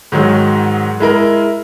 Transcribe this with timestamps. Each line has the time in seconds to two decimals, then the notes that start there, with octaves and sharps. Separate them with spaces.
0.12 G#2 D#3 F#3 G#3
1.00 G#3 E4 A#4